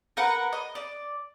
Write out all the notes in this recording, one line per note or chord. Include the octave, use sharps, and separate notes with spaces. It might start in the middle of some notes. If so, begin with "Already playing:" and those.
A#4 B4 F#5
D#5
D5